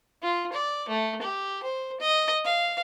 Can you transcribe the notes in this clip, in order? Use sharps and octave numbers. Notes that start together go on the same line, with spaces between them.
F4
D5
A3
G4
C5
D#5
F5